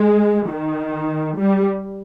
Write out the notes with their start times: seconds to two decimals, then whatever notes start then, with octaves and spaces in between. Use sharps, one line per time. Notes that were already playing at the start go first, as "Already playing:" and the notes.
Already playing: G#3
0.50 D#3
1.38 G3